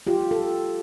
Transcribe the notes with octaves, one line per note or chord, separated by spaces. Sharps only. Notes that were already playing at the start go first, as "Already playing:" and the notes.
F4 G4
A4